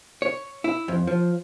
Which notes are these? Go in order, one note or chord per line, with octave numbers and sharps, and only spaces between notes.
C#5
E4
F2
F3